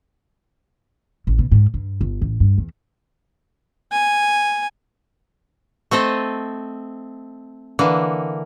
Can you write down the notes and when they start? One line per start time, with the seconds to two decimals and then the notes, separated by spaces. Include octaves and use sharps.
1.27 A1
1.39 B2
1.52 G#2
1.74 G2
2.01 G1
2.21 A1
2.40 G2
2.58 E2
3.92 G#5
5.91 A3 C4 A4 D#5
7.79 D3 E3 A#3